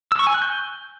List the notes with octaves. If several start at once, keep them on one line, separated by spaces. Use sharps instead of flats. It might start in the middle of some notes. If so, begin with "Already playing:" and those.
E6
C#6
G#5
F#6
G6